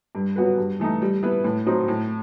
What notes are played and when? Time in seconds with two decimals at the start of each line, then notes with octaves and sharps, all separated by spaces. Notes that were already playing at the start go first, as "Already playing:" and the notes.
0.15 G2
0.36 F#3 B3 F#4 B4
0.58 G2
0.80 E3 A3 D#4
1.02 G3
1.23 B3 E4 B4
1.44 A2
1.66 F#3 C4 D#4
1.88 A2